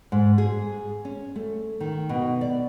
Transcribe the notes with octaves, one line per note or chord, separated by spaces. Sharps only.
G#2
G#4
C#4
A3
D#3
B2
D5